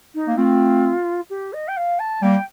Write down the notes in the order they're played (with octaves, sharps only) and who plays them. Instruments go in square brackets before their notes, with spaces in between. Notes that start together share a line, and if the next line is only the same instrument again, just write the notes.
[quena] D#4
[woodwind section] A#3
[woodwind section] A3 C4 [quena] F4
[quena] G4
D#5
G5
F5
A5
[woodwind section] G3 A#3 [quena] G5